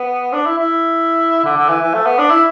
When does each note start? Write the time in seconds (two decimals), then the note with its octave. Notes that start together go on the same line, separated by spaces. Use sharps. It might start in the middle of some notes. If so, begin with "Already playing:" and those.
Already playing: B3
0.33 D4
0.46 E4
0.59 E4
1.45 D3
1.56 D3
1.69 E3
1.81 E3
1.94 A3
2.06 B3
2.18 D4
2.30 E4